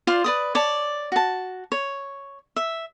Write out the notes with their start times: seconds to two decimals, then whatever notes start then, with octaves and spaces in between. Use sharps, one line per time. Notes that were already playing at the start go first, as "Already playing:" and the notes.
0.07 F4 C5 D5
0.24 B4 D5 D#6
0.55 C#5 D5 A5
1.12 F#4 A5
1.72 C#5
2.56 E5